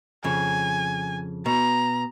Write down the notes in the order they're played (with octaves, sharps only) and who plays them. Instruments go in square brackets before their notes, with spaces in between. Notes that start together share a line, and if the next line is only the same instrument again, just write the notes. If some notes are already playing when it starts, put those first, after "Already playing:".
[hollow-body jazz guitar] F2 C#3 [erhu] G#5
[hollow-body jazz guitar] B2 [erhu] A#5